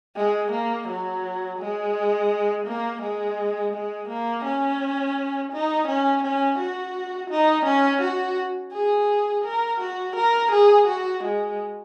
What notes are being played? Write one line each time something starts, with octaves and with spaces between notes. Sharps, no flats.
G#3
A#3
F#3
G#3
A#3
G#3
G#3
A#3
C#4
D#4
C#4
C#4
F#4
D#4
C#4
F#4
G#4
A#4
F#4
A#4
G#4
F#4
G#3